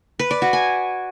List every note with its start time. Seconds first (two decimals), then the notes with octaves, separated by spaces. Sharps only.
0.19 B4
0.31 D5
0.42 F#4
0.53 G#5